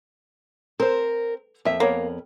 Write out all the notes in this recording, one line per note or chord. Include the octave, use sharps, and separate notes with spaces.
C4 A#4 C5
F2 A#3 E5
A#3 B3 A#4 C#5